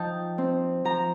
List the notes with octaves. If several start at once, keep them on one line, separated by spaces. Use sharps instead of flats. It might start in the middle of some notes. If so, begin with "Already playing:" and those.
Already playing: F3 D#4 G5 A5
C4
F3 A#5